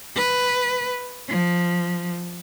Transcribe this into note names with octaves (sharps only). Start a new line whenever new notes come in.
B4
F3